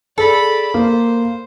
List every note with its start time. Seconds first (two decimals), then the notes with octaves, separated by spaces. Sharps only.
0.18 G#4 A4 D5 B5
0.74 A#3 C5